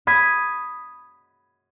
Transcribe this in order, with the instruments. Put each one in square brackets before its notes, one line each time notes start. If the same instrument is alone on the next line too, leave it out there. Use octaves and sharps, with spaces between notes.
[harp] B5 D#6 G#6 B6